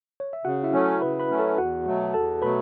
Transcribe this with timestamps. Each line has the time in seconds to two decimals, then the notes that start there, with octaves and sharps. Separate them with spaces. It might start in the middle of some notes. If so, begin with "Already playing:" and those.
0.20 C#5
0.33 E5
0.45 C#3 F#4 F#5
0.64 E4 E5
0.73 F#3 A3 C#4
1.01 C#3 B4 B5
1.20 B4 B5
1.29 F#3 A3 C#4
1.39 A4 A5
1.58 E2 F#4 F#5
1.86 B2 F#3 A3
2.14 E2 A4 A5
2.42 B2 F#3 A3 B4 B5